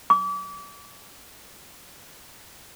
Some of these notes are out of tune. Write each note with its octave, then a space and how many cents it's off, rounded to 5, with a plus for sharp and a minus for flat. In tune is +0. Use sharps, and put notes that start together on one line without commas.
D6 -35